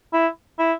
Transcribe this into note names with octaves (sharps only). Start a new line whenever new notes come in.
E4
E4